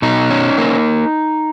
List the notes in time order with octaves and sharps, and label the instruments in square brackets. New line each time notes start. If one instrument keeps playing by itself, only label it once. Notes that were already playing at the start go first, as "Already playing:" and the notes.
[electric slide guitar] B2 D#4
C#4
A#3